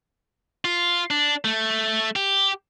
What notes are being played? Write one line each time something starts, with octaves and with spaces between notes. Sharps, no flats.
F4
D4
A3
G4